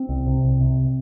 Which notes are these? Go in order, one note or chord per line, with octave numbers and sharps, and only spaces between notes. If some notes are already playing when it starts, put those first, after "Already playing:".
Already playing: C4
C2
C3
C2
C3